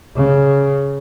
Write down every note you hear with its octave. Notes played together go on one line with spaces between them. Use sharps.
C#3